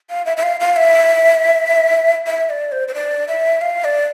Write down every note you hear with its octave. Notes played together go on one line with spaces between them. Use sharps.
F5
E5
E5
F5
F5
E5
E5
D5
C5
C5
D5
E5
F5
D5